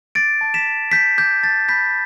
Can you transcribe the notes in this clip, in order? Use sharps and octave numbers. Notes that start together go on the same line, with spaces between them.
D6 A6 D7
A5
B6 E7
A5
G6 B6
D6 G6
A5 A6
B5 G6 B6